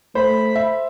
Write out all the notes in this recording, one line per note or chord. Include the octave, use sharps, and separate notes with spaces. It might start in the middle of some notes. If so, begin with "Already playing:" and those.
A3 C5 B5
E5